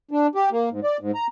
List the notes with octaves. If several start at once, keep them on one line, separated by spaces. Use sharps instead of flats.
D4
G4
A#3
G#2
D5
G#2
A#5